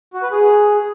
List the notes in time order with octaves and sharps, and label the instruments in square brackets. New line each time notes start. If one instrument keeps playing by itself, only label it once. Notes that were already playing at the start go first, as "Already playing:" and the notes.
[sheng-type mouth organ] F#4
B4
G#4